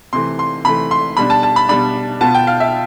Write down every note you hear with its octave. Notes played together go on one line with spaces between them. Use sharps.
C3 E3 A3 C6
C6
C3 E3 A3 B5
C6
B2 G3 D4 B5
A5
A5
B5
B2 G3 D4 B5
B2 B3 F4 A5
G5
F5
E5